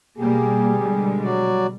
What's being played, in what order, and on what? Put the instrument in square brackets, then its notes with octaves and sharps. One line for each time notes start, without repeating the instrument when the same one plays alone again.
[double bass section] B2 G3 [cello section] A#3 [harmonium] G4 [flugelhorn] G#4
[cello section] D3 G#3
[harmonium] F#3 F#4 D5